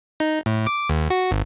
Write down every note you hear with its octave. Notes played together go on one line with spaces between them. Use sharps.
D#4
A2
D6
D#2
F#4
G#1